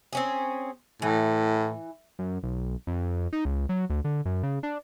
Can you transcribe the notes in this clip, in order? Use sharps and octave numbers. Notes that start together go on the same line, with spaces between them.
C4 C#4 G#4
A2 E3
F#2
B1
F2
D#4
C#2
F#3
D2
D3
F#2
C#3
D4